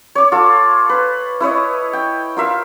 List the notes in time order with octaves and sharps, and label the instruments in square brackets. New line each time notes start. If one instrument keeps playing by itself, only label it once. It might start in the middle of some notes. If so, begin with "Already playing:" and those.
[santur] C#5 D6
F4 A4
B4
E4 B4 C#5 D#5
G5
F4 A#4 E5 F5